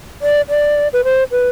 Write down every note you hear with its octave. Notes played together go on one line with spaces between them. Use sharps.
D5
D5
B4
C5
B4